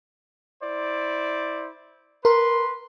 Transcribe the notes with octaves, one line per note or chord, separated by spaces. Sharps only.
E4 C5 D5
A#4 B4 C6